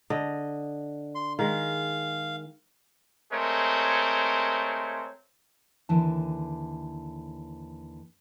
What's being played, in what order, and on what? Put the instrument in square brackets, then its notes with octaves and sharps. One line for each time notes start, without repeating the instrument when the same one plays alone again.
[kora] D3 D#5
[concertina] C6
[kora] D#3 G#3 [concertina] F5
[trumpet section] G#3 A3 C4 A#4 C#5
[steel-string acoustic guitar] D#2 D3 E3 A5